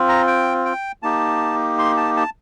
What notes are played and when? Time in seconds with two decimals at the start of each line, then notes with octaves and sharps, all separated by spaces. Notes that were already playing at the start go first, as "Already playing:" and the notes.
Already playing: C4 F4
0.09 A#5
0.27 G5
0.65 G5
1.03 A#3 D#4 G4 A5
1.79 C6
1.97 A5
2.17 A5